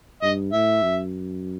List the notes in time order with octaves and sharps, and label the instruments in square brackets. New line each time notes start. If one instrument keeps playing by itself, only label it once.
[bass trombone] G2 [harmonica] D#5
[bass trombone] A2 [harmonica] E5
[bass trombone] F#2